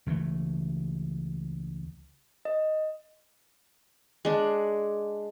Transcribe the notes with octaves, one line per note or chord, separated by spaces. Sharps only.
C#2 E3 G#3 A3
D#5
G#3 D4